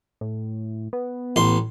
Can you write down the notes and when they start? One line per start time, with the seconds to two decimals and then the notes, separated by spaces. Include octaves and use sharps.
0.21 A2
0.93 B3
1.36 A1 C6